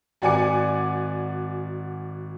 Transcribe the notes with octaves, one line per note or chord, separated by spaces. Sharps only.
G#1 F#4 D5 G#5 D6 C#7